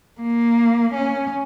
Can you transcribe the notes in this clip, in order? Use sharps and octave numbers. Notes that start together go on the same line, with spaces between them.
A#3
C#4